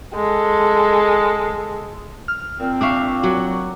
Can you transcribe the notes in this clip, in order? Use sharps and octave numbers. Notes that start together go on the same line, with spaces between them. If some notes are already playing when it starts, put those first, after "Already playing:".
G#3 A4
F6
A#2 C4
D4 E5 F5 C#6 D6
F#3 F#4